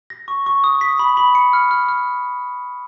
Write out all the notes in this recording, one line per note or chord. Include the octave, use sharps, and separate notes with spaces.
A#6
C#6
C#6
D#6
B6
B5
B5
C#7
F6
F6
F6